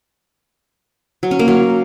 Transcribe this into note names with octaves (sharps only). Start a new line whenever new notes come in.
F#3
C#4
A#3
F#3